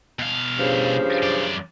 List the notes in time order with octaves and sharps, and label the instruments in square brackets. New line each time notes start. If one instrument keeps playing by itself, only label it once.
[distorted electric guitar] B2 F5
[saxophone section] G2 C#3 F3
[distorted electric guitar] F#2 D5